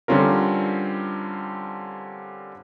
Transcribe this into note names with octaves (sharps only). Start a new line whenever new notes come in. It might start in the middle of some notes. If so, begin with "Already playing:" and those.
D3 G3 C4 C#4 F4 A#4